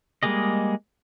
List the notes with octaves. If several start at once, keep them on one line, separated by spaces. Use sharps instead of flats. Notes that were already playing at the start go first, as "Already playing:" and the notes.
G3 G#3 A#3 G#4 D#5